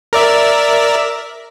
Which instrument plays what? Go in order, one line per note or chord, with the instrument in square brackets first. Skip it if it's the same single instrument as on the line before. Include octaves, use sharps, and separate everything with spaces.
[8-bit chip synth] A#4 D5 E5